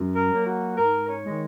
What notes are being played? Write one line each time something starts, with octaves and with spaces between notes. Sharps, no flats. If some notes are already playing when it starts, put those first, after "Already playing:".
Already playing: F#2
A#4
F#3 A#3
F#4
G#2 A#4
C#5
D#3 G#3